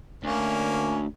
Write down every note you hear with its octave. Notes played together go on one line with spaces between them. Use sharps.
D2 A#3 C#4